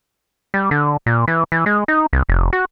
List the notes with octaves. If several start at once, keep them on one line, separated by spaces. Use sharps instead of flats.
G3
D3
A#2
E3
E3
G#3
D#4
C2
F1
F#4